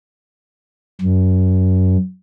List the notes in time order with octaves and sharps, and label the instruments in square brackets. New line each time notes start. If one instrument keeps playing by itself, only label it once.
[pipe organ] F#2